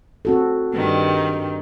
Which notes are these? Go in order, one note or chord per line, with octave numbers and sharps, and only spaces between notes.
C4 F#4 A4
G2 D#3 G3